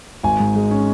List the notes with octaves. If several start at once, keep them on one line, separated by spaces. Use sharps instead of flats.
G#1 G#5
G#2
G#3
C#4